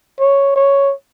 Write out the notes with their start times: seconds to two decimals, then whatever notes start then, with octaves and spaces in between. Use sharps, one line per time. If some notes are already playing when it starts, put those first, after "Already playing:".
0.20 C#5
0.56 C#5